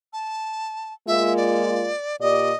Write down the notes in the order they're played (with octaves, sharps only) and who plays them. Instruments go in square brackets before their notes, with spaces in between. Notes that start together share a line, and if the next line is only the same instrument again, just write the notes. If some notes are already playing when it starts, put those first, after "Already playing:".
[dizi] A5
[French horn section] G#3 A#3 F4 [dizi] E5
[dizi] D5
[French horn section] A#2 G4 D5 [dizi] D#5